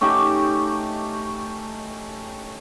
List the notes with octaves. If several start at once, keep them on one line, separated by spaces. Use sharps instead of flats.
A3 C#4 D#4 G4